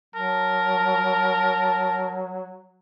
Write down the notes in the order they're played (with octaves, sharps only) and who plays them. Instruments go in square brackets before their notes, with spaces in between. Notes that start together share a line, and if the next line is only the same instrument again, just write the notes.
[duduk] F#3 [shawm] A#4 [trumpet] A5